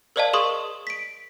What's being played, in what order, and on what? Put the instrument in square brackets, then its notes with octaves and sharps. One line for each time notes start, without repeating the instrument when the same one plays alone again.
[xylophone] A#4 C5 D5 D#5 F5 A5
G#4 A#4 C6 C#6 D#6
B6 D7